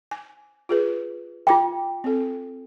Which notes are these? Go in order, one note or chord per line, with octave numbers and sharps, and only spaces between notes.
G#5
F4 G#4 B4
F4 G5 B5 D6
C4 A4